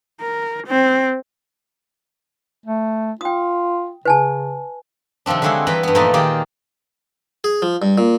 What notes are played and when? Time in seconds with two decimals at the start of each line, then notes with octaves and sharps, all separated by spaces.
0.21 A#4
0.68 C4
2.66 A3
3.21 F4 G5 D#6
4.05 C#3 B4 G#5 A5
5.26 C3 D#3 F3 C4 D4
5.42 D3 F#3 G#3 E4 F#4 G#4
5.67 E3 G3 B4 G5 A#5 B5
5.83 G2 B3
5.95 A#2 F3 A3 A#3 D#4 A5
6.14 D#3 A#3 G4 G#4 D5 G5
7.44 G#4
7.62 F3
7.82 G2
7.98 A#2